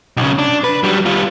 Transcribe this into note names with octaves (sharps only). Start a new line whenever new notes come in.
B1 C#3
D4
B4
F#3 G3
G3 F4